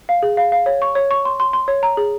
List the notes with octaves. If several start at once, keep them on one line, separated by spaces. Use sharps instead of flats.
F5
G#4
F5
F5
C#5
C#6
C#5
C#6
C6
C6
C6
C#5
A#5
G#4